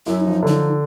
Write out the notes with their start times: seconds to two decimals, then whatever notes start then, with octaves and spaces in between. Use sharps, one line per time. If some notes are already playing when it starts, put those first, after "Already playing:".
0.06 F#2 E4
0.20 F3 D#4
0.43 D3
0.48 D#4